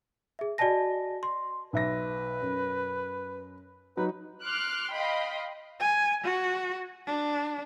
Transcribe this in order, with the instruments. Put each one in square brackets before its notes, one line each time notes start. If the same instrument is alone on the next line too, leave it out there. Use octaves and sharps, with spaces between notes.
[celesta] G#4 E5
F#4 D5 D#5 G#5 A5 A#6
C6
[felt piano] B1 E5 A#6 [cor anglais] B4
[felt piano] F#2
[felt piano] F#3 D#4 [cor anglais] B4
[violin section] C6 D6 F6 F#6
D#5 F5 G5 B5 C6
[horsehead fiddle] G#5
F#4
D4